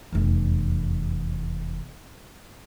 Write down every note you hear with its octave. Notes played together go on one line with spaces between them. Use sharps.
F1 E2